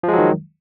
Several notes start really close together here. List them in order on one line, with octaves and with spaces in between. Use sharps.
F3 G#3 F#3 D#3